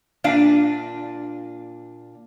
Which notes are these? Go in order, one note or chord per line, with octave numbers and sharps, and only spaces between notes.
A#2 D4 F5